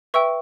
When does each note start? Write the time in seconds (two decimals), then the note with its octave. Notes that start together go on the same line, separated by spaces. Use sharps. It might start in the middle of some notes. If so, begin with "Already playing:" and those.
0.14 B4 E5 G5 C#6 E6